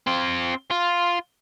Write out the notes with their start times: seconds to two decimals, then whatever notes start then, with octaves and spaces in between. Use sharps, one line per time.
0.07 C4 F4
0.71 F4